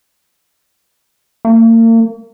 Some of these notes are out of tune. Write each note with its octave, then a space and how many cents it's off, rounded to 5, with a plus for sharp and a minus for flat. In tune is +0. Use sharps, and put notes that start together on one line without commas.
A#3 -40